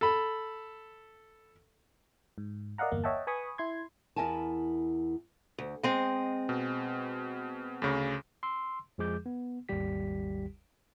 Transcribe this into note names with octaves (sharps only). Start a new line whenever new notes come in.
A4 B5
G#2
A#4 D5 D#5 F5 F#5 A#5
G1 E2 A#3
C#5 D#5 E5 F#5 G5 A5
B4 G#5 B5 C#6 D#6
E4 C6 G#6
E2 E4 A#4 E5 G#5 A5
D2
G#3 C4 D#5
B2
D2 C#3
C6 E6
F2 F3 G#3 G#4 D6 G6
B3
G#1 D#2 G3 G4 B6